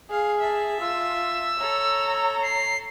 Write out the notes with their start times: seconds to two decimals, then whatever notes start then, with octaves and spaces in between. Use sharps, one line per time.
0.10 G#4 F5
0.40 E5 A5
0.81 F4 E6
1.59 A4 C#5 A#5
2.42 C7